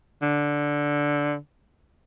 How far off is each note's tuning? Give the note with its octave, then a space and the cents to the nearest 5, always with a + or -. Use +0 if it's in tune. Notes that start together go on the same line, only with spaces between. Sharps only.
D3 -5